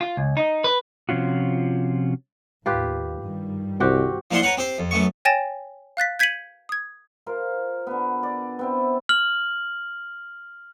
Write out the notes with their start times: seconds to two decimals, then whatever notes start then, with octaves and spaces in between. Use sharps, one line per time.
0.01 F4
0.17 C#2
0.37 D#4
0.64 B4
1.09 C3 F3 C#4 F4 F#4
2.66 D#2 A2 F4 G4 B4
3.21 G2 D#3 G3
3.80 C2 C4 F#4 G4
4.31 F3 A#3 D4 E4 F#5 C6
4.42 A#4 B4 C#5 F#5
4.57 C4 G4 C5
4.78 F2
4.91 F#2 A3 B3 C#6
5.25 C#5 G5 G#5 A6 A#6 E7
5.97 F5 F#6 A6 B6
6.19 G6 G#6 B6 C#7 D#7 F#7
6.69 D#6 G#6
7.26 F4 A#4 C5 F5
7.87 D3 B3
8.23 D5
8.59 B3 C4 E4
9.09 F6 F#7